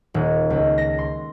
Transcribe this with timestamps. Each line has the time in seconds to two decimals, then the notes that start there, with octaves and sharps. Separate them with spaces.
0.14 D#1
0.50 C#2
0.78 A#6
0.99 C6